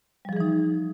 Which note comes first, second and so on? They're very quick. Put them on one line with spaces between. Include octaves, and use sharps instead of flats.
G3 F3 G#4 E3 D#4